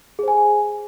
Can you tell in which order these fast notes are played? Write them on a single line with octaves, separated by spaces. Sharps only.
G#4 C5 G#5